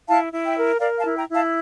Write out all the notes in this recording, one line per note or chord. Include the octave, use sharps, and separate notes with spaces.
E4 F5 A5
E4
E5 G5
A#4
A#4 D5 F5
F5 A5
E4
G5 A#5
E4
F5 A5